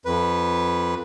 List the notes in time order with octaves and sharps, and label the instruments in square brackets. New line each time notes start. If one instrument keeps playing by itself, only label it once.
[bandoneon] F2 B4